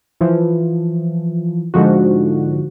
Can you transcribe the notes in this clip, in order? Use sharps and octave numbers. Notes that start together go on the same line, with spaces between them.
E3 F3
G#2 D3 F3 F#4